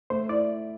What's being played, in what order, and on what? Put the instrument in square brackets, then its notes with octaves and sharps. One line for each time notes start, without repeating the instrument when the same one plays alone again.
[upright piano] A3 [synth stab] C5
[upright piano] E4 [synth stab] D5